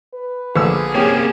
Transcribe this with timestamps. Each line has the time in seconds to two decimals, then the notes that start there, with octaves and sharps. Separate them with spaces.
0.14 B4
0.56 A#1 D3 G#4 E6
0.95 A#3 C4 C#4 G4 C#5